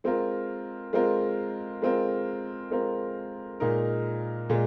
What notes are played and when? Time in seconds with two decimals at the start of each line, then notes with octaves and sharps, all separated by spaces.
0.04 G#3 C4 F4 A#4
0.93 G#3 C4 F4 A#4
1.82 G#3 C4 F4 A#4
2.71 G#3 C4 F4 A#4
3.60 A#2 G#3 D#4 A#4
4.50 A#2 G#3